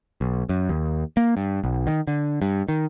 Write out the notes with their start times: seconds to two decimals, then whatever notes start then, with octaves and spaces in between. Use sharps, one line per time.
0.21 B1
0.49 F#2
0.69 D#2
1.17 A#3
1.37 G2
1.64 B1
1.87 D#3
2.07 D3
2.42 G2
2.69 D#3